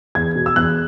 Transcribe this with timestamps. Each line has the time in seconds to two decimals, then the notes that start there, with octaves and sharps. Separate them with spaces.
0.15 E2 G#6
0.36 B2
0.46 E6
0.56 E2 F#6